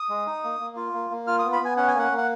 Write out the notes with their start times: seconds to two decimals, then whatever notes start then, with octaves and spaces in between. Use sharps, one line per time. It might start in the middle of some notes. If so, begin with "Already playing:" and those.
Already playing: D#6
0.09 G#3
0.26 D#4
0.44 A#3
0.60 A#3
0.76 F4
0.94 A#3
1.10 A#3
1.27 F4 F6
1.39 D#6
1.44 B3
1.53 B5
1.60 B3 G#5
1.77 C#4 F#5
1.88 G#5
1.94 A#3 F#5
2.11 A#3
2.18 F#5